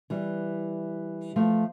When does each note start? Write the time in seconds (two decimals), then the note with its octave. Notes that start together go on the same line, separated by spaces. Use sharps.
0.10 E3 G3
1.36 F3 A3